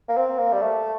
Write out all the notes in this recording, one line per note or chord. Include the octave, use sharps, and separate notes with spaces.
A#3
C4
A#3
G3
A3